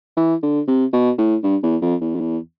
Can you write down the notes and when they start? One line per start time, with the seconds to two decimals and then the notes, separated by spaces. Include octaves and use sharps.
0.17 E3
0.43 D3
0.68 C3
0.93 B2
1.18 A2
1.43 G2
1.63 E2
1.82 F2
2.01 E2
2.15 F2
2.20 E2